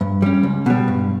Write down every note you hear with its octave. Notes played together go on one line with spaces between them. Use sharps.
G2
G3 C#4
C#2
B2 G3
G2